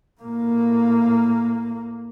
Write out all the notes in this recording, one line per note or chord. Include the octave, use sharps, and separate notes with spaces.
A2 A#3